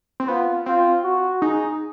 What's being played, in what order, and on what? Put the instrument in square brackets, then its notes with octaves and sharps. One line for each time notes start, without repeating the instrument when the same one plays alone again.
[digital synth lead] C4
[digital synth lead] B3 [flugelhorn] F4
[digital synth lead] C4 [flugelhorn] F4
[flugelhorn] F#4
[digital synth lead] D#4 [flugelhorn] G#4